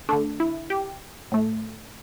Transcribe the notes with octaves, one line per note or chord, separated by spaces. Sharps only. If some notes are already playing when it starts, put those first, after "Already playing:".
D3 A3 D4
E4
G4
A2 A3